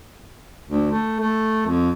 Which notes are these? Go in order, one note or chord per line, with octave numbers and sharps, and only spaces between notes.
D2
A3
A3
F2